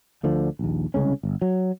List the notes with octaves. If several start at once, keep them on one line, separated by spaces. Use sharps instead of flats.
D2 D3 F3
A#1 D#2
C2 C#3 G#3 C#4
G1
F#3